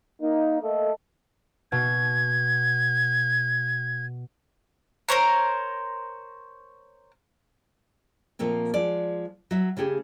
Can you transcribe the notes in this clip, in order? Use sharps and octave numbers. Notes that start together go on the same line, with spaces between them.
A#3 D#4
A3 A#3 A4 D#5
B2 G#6
A#4 C5 C#5 A#5
A#2 F3 A3 A#3 C4
F3 G#3 D5
F#3 E5
C#3 A3 G4 G#4